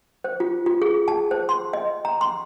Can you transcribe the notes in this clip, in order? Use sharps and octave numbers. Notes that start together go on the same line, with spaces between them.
C5
F4
F4
G#4
A5
C5
C6
D#5
A#5
C6